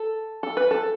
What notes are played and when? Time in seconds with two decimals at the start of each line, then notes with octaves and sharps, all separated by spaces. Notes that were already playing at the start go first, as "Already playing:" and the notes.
Already playing: A4
0.43 A4
0.57 B4
0.71 A4